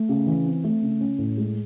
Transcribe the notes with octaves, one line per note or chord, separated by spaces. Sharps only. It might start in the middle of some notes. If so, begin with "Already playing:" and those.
Already playing: A3
C#3
E3
C4
A3
C#3
C#4
A2
G#3